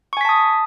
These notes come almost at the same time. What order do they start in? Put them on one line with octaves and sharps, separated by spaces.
C#6 G#5 B6 A5 D#6